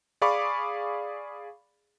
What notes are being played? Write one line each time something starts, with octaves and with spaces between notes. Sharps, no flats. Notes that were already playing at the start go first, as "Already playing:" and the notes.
G#4 D5 F5 B5 C#6 D6